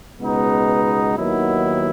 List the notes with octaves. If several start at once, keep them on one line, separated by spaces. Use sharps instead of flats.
C#2 B2 G#3 B3 D#4
D#2 D#3 F#3 B3 E4